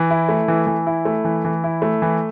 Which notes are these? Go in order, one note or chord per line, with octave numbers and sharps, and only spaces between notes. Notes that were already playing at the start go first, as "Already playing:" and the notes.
Already playing: E3
E4
A3
E3
E3
E4
A3
E3
E3
E4
A3
E3